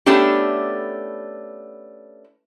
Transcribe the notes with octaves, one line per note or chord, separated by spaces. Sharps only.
A3 B3 C#4 D4 E4 G4